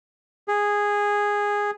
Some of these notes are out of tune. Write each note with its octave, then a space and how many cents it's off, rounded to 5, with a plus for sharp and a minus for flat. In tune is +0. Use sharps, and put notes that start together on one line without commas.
G#4 -10